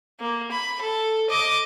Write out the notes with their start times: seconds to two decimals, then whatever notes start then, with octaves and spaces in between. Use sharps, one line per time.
0.20 A#3
0.52 B5
0.82 A4
1.30 D#5 D6